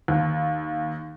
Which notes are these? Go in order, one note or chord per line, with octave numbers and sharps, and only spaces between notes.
D#2